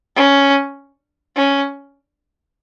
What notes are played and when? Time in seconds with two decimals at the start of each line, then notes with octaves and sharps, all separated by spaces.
0.16 C#4
1.36 C#4